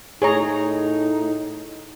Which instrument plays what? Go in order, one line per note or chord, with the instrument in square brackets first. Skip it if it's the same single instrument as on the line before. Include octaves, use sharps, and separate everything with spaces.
[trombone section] A2 D#4 [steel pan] G#4 C#5 A#5